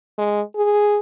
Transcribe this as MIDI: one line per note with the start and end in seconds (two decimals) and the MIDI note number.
0.18 0.41 56
0.56 1.00 68